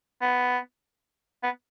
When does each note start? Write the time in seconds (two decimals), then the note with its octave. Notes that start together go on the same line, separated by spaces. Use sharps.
0.21 B3
1.43 B3